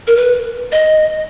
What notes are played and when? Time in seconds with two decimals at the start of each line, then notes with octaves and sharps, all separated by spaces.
0.07 A#4
0.17 B4
0.72 D#5